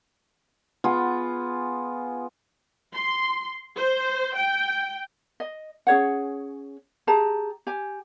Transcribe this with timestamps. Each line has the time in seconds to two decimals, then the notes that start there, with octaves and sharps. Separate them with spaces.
0.84 B3 F4 G#4
2.94 C6
3.76 C5
4.36 G5
5.40 D#5
5.87 C#4 G#4 C#5 F#5
7.07 G4 G#4 A5 A#5
7.67 G4 G#5